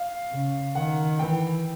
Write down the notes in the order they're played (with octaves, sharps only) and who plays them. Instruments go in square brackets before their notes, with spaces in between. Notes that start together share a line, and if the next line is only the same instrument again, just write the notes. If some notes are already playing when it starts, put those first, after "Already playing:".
Already playing: [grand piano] F5
[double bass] C#3
[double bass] D#3 [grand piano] F#5
[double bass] E3 [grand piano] G5